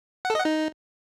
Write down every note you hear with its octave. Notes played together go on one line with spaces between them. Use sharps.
F#5
A4
D#5
F#5
D#4